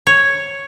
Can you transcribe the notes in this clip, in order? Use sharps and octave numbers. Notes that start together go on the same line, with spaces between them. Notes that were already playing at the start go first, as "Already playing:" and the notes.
C#5